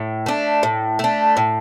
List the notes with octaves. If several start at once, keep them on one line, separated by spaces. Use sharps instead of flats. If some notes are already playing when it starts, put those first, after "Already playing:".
Already playing: A2
A3 D4
A2
A3 D4
A2